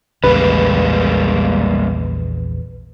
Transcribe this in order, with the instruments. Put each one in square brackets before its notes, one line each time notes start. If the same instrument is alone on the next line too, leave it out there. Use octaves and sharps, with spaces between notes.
[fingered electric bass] A#1 E2 C#3 [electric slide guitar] G3 G#3 A#3 [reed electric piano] B4